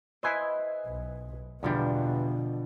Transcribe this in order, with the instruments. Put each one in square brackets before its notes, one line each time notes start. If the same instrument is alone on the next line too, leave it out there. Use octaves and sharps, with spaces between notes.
[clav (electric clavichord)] E4 B4 C5 [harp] D#5 G#5
[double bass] B1
[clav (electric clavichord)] E2 G3 [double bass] B2 [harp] D3 F3 D4